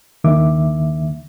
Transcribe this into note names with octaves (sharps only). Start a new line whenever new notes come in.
D#2 D3 D#3 A#3 E5 D6